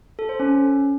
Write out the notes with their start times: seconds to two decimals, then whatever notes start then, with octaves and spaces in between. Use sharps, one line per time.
0.19 A4
0.29 C5
0.40 C#4